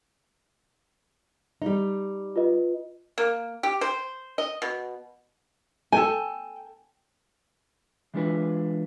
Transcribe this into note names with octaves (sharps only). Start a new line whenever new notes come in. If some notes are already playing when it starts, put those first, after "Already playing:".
G3 D#4
F4 B4 D#5
A#3
G4
C5
D#5
B2
A4 G5 G#5
E3 G#3 D4 F4 B4